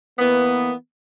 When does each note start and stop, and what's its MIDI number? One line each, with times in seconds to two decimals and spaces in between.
0.19 0.73 52
0.19 0.73 58
0.19 0.73 59